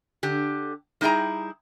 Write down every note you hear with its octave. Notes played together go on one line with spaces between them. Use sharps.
D3 G4
G3 D#4 E4 G#4 G5 A#5